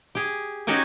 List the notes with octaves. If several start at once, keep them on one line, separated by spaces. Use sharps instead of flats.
G4 G#4
C#4 D#4 F#4 G4 G#5